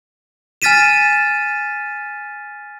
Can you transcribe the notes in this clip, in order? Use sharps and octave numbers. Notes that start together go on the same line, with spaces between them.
G#5 F6 A6 B6 D#7 E7